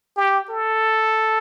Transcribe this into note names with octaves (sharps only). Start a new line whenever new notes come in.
G4
A4